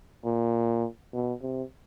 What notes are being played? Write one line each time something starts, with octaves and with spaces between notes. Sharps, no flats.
A#2
B2
C3